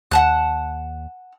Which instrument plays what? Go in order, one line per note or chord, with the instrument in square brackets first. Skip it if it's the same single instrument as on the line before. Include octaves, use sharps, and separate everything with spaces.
[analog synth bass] D#2 [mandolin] F#5 A5 F#6